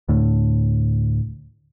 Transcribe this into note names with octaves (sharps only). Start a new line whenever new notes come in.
D2 A2 D3